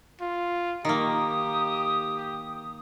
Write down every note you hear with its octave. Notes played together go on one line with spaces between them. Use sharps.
F4
D#3 A#3 G4 D#6